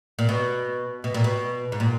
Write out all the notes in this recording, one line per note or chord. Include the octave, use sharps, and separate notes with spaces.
A#2
B2
B2
A#2
B2
G#2
A#2